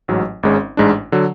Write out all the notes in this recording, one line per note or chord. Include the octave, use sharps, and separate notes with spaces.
A1 G#2 F#3
G#1 G#2 G#3 C#4
A1 G#2 G#3 D4
D3 F#3